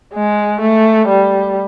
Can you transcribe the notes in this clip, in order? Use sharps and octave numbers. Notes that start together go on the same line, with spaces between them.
G#3
A3
G3